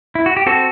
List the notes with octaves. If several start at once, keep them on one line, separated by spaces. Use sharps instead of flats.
E4
F#4
G4
C4 F#4 A4